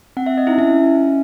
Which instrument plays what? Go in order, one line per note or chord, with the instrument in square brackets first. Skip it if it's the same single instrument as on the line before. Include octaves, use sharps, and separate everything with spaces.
[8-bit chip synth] C4 [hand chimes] F#5
[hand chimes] E5
D#5
[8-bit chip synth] D#4 [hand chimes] E4 E5
[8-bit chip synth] C#4 [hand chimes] E4 E5